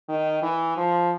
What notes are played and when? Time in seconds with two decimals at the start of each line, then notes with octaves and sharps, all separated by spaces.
0.09 D#3
0.42 E3
0.77 F3